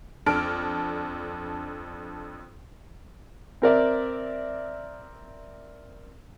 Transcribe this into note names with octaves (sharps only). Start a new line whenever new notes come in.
F2 D4 A4 A5 F6 D7
C4 A#4 D5 E5